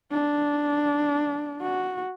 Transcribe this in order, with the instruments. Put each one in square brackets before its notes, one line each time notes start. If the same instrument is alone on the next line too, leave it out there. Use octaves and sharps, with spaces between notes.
[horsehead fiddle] D4
F#4